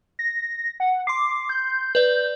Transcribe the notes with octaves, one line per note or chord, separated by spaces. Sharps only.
A#6
F#5
C6 D6 C7
G6
B4 D5